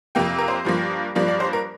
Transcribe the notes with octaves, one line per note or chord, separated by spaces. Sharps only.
F2 C3 A#3 G5
A#4
C5
G2 F3 A#3
G2 F3 A#3 D5
D5
C5
A#4